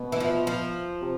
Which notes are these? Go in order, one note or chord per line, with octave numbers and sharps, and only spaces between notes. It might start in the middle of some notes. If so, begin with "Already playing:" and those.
Already playing: B2
E3
F3
F3
C3